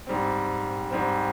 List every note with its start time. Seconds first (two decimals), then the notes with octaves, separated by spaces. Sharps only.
0.07 G#2 G3 C4
0.90 G#2 G3 C4